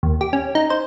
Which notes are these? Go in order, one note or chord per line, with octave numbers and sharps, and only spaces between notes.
D#2
G4
C#4
D#4
C5